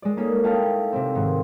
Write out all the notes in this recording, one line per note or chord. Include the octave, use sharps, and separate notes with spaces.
G#3 D5
A#3 C#4 D#4 A4
C#4 D#4 E4 F5 G5 A5
C3 C4
G#2 D#3